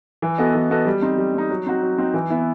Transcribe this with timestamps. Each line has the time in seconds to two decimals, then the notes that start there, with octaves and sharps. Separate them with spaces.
0.22 E3
0.38 B3 F#4 A4 D#5
0.55 E3
0.70 B3 F#4 A4 D#5
0.86 G3
1.02 C4 D#4
1.18 G3
1.35 C4 D#4
1.50 F#3
1.66 C4 D#4 F#4
1.82 F#3
1.98 C4 D#4 F#4
2.14 E3
2.30 B3 E4